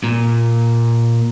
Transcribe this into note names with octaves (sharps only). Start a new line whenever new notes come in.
A#2